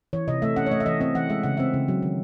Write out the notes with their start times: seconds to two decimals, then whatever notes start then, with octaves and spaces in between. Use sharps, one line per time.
0.13 E3 C#5
0.28 C3 D#5
0.42 A3 E5
0.56 C#4 F#5
0.66 C#5
0.71 A3 D#5
0.80 E5
0.86 E3 D#5
1.01 C4 D#5
1.15 E3 F#5
1.29 G#3 E5
1.43 C#3 F#5
1.57 C4 E5
1.74 C#3
1.88 F#3
2.02 D#3